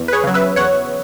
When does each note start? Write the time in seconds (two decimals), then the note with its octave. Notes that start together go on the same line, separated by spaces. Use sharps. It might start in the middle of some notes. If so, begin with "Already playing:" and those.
Already playing: E2
0.08 B4
0.13 G#4 C#5
0.24 C#3 F#3
0.34 B4 E5
0.56 E2 C#5 F#5